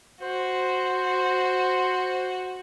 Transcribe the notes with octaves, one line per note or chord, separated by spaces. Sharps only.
F#4 C5